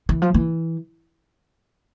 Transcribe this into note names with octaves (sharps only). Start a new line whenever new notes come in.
E3
F3
E3